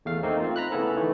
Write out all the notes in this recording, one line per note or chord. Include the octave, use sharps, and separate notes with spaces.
E2 A3 F5
A3 A#3 C4 D#4
C4 F4
A#5 B5 F#6
C#3 A3 B3 C#4 E4 A4
D#3 E3 A3